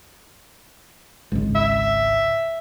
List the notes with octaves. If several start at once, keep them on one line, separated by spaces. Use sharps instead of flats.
G#1 C#2
E5